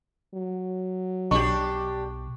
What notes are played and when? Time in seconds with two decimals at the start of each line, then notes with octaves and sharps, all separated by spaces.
0.34 F#3
1.31 B1 D4 G4 C#6